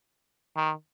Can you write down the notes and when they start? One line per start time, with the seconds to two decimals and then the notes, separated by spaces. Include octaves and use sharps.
0.56 D#3